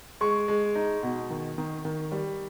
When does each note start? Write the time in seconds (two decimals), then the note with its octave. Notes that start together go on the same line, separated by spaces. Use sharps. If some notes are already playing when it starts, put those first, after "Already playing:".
0.21 G#3 C#6
0.48 G#3
0.75 D#4
1.03 B2
1.30 D#3
1.58 D#3
1.85 D#3
2.12 G3